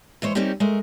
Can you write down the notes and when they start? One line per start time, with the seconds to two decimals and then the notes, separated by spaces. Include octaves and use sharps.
0.22 E3 G#3 C5 C#5
0.35 G3 A#3 C4 C#4 D#4 G4
0.60 G#3 A3 A#4